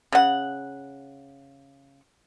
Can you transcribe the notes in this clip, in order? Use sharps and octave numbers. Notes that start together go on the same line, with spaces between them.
C#3 F#5